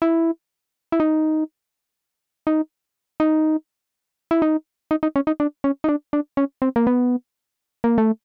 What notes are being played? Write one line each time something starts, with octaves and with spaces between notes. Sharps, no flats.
E4
E4
D#4
D#4
D#4
E4
D#4
D#4
D#4
C#4
D#4
D4
C#4
D#4
D4
D4
C#4
C4
A#3
B3
A#3
A3